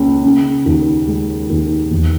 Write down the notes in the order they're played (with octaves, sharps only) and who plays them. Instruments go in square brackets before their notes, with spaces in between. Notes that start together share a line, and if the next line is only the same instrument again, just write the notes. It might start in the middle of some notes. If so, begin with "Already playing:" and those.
Already playing: [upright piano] C#2 A#3 C#4
C#3
D#2
G#3
D#2
E2